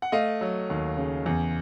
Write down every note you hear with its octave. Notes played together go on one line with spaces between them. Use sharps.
F#5
A3 D#5 F5
F#3
D#2
C#3
E2